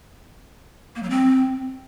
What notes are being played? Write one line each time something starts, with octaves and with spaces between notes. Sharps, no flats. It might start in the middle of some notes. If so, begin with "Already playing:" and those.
A#3
F#3
C4